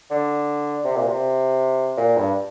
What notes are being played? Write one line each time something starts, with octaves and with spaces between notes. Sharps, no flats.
D3
C3
A#2
C3
A#2
G2